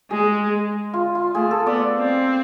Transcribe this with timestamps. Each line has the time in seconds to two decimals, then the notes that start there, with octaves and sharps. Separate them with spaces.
0.11 G#3 G#4
0.94 F4
1.15 F4
1.35 A3 G#4
1.51 A4
1.66 B3 D5
1.97 C4